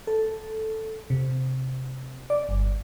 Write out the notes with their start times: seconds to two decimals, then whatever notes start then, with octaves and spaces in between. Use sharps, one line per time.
0.07 A4
1.10 C3
2.30 D5
2.49 G1